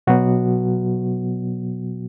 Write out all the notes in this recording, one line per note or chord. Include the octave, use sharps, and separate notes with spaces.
B2 F#3 B3 F#4